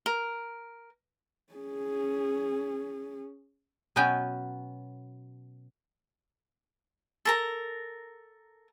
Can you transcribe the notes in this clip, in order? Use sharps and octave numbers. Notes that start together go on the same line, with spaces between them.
A#4
C#4 G#4
B2 F#3 B3 C#4 G5 G#5
A4 A#4 A#5